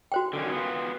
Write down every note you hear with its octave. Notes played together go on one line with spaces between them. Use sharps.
F#4 C5 G5
D3 D#3 C#4
B3 F4